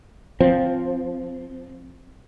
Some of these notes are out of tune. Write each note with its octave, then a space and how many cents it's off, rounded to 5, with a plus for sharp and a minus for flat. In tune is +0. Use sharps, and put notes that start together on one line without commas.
F3 +0 C4 +0